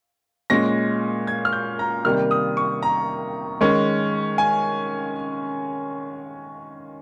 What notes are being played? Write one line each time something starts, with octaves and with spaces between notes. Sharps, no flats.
A#2 G#3 C#4 A#6
G#6
F6
G6
A#5
C3 D#3 G3 A#3 F6
D#6
C#6
A#5
D#3 G#3 C#4
G#5